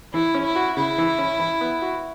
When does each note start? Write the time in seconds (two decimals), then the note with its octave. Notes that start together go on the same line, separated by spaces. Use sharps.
0.13 E3 E4
0.34 C#4
0.45 E4
0.56 F#4
0.76 C#3 E4
0.98 E3
1.18 C#4
1.39 E3
1.61 B3
1.82 F#4